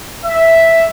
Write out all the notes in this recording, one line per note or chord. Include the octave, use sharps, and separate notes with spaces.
E5